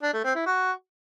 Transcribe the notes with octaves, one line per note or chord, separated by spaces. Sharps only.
D4
A3
C4
E4
F#4